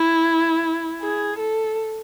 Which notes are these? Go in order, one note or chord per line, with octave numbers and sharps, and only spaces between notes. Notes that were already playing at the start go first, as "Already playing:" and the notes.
Already playing: E4
G#4
A4